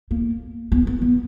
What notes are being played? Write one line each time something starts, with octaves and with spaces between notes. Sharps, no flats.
A#3
B3
B3
B3